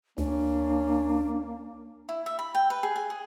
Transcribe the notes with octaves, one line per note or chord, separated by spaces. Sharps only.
D2 A#3 C#4 D4
E4
E5
B5
G5
B4
G#4
G#5
G#4